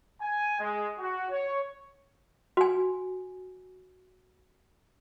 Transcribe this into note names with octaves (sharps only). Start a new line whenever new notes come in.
G#5
G#3
F#4
C#5
F#4 G#5